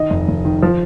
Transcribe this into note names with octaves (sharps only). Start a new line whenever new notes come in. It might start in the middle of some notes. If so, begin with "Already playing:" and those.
Already playing: D#3 D#5
F1
F1
D#3
F3